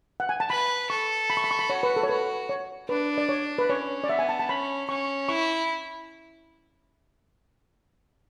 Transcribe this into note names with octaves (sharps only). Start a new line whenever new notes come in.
F#5
G#5
A5
B4 B5
A4 C#6
B5
C#6
B5
C#6
B5
F#4 C#5
B4
A4
C#5
F#4 B4
C#5
D4 B4
D5
C#5
B4
C#4 C#5
D5
B3 E5
G#5
A5
A5
C#4 B5
C#4 C#6
E4 C#6